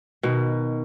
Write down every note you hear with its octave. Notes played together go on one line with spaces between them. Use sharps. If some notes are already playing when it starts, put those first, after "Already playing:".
B2 D#3